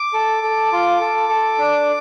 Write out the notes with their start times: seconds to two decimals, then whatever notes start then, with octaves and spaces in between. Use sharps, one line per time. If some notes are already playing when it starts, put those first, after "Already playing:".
Already playing: D6
0.13 A4
0.43 A4
0.72 F4
1.01 A4
1.29 A4
1.58 D4